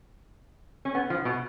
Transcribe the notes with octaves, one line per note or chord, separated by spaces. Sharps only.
C#4
B3
F3
B2